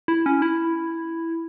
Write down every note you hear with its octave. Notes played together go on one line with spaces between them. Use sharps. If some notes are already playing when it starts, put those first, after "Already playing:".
E4
C#4
E4